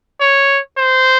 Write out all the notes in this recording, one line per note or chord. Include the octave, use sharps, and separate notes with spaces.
C#5
C5